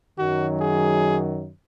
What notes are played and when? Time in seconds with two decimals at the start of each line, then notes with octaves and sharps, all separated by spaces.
0.17 F#2 D#3 F#3 F#4
0.59 G#4